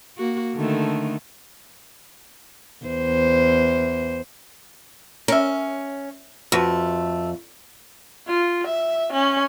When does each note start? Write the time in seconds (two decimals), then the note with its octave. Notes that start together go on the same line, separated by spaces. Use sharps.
0.18 A#3 F#4
0.55 D3 D#3 A3
2.85 E2 C5
5.28 C#4 A#4 E5
6.52 F2 A3 F#4 B4
8.28 F4
8.67 E5
9.13 C#4